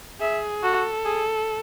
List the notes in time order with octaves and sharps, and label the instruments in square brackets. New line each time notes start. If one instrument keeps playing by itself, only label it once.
[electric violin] G#4 [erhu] E5
[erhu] F#4 [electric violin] A4
[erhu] G#4